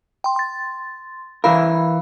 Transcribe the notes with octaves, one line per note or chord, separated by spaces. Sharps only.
G5 C6
C6 A6
E3 E4 A#4 F5 B5